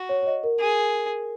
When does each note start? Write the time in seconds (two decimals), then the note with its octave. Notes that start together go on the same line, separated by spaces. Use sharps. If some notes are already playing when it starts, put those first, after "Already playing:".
Already playing: F#4
0.09 C#5
0.23 C#5
0.27 D#5
0.44 A#4
0.61 G#4